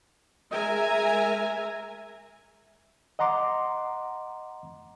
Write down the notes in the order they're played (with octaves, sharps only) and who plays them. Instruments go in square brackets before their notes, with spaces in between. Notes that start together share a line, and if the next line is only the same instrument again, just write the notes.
[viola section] G#3 A#4 E5 G#5 A#5
[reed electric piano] D#5 F#5 A#5 C6 D6